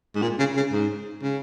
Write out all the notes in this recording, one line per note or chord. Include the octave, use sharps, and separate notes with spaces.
G#2
A#2
C#3
C#3
G#2
C#3